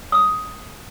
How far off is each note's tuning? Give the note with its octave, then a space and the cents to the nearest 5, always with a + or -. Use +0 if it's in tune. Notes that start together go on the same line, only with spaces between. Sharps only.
D#6 +10